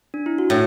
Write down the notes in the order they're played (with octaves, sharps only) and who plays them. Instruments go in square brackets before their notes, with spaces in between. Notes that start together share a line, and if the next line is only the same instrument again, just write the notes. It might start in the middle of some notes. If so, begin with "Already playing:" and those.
[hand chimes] D4
E4
F#4
[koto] A2 [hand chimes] A4